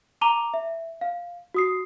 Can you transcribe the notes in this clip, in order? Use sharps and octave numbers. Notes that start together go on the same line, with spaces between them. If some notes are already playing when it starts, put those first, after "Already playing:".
A5 A#5 D6 D#7 F7 G7
E5
F5
F#4 D#6 C7